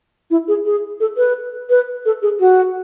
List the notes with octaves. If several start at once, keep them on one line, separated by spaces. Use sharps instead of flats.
E4
G#4
G#4
A4
B4
B4
A4
G#4
F#4